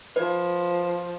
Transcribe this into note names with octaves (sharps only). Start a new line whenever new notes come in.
F3 B4